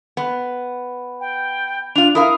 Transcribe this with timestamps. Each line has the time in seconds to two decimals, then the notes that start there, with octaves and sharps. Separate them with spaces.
0.17 B3
1.20 G5
1.95 D4 F4 F7
2.15 E4 A#4 F5 D#6